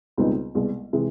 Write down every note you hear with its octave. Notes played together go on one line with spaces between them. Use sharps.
C#2 B2 G3 C4 D#4
C2 B2 G#3
C3 E3 G#3